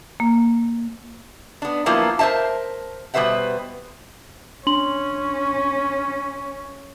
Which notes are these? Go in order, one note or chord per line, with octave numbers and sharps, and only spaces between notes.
A#3
B3 D4
F3 F#3 A#3 B3 E4 F4
A#4 C5 C#5 E5 A5
B2 G3 B4 C5 E5 F#5
C#4 D4 C6 F#7